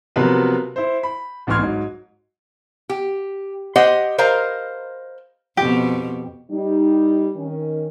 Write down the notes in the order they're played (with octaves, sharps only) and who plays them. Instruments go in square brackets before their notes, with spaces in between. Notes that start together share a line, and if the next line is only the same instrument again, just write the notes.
[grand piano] C3 F3 F#3 B3 A#4 B4
E4 C5
B5
A1 D2 E3 C6 F6 G#6
G#2 F#3
[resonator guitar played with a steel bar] G4
G4 C5 D#5 F#5
A#4 C5 D#5 F5 A#5
[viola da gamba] F2 B2 [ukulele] G4
[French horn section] G3 D#4
D#3 C#4